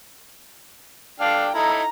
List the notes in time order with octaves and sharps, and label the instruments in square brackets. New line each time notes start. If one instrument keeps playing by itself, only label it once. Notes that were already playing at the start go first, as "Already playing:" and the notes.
[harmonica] D4 A4 G5 [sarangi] F5
[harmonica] D#4 E4 A4 [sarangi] A#5